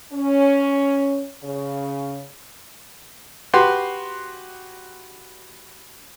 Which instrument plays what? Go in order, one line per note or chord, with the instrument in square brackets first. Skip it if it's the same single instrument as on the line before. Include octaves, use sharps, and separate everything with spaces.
[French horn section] C#4
C#3
[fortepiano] F#4 G4 B4 C6